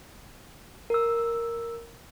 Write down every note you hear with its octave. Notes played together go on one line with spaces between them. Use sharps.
A#4 E6